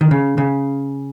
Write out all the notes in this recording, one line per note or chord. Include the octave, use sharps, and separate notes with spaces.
D#3
C#3
C#3